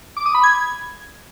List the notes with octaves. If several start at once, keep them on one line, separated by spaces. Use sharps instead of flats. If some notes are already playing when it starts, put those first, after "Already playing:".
D6
D#6
B5
G#6